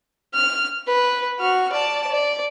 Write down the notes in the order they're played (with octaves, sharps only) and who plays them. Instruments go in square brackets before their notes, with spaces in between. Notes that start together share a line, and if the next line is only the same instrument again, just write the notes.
[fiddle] F6
B4
F#4 F6
D5 A5
D5